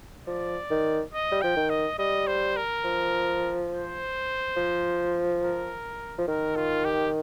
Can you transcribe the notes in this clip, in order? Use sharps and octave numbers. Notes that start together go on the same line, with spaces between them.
F3 D5
D#3
D#5
G3
F3 G5
D#3
D#5
G3 D#5
C5
A#4
F3
C5
F3
A#4
F3
D#3 A#4
F4
G4